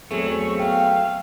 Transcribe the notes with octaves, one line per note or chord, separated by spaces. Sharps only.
E2 F#3 A3 C4 G#4 C#6
B3 F5 G5